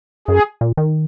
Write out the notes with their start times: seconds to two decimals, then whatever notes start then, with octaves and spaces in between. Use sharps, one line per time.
0.28 F#2 G#4
0.61 A#2
0.77 D#3